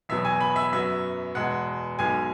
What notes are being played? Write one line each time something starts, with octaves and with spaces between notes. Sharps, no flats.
E2 B2 F#3 B3 E5
G#5
B5
E5
F#2 F#3 B3 E5
E2 B2 G#3 F#5
B1 B2 G#3 G#5